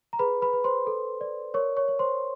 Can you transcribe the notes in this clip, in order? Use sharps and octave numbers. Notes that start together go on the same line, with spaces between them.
A#5
G#4 B4 B5
B4 B5
B4
C5 C6
A4
D5
A#4 C#5 C#6
C#5 C#6
C#5
C5 C6